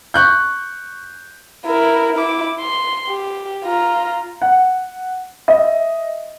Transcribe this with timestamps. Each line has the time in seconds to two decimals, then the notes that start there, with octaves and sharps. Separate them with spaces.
0.14 C#6 F#6 G6
1.66 E4 A#4
2.16 E4 D6
2.61 C6
3.08 G4
3.64 F4 A#5
4.42 F#5
5.48 D#5 E5